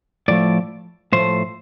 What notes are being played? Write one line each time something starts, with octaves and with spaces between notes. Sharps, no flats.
A2 F3 A3 D5
A2 F3 A3 C5